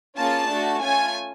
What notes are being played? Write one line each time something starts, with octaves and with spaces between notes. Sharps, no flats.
A#3 C#4 F4 G#4 A5
A3 D4 F#4
A3 C#4 F4 G#5